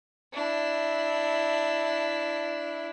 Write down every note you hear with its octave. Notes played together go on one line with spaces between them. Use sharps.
D4 E4